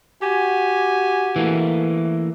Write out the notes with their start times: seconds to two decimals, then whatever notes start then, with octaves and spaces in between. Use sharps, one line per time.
0.22 F#4 G4 G#5
1.36 E3 A3 A#3